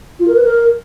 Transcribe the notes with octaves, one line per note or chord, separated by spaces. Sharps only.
F4
A#4
B4
A#4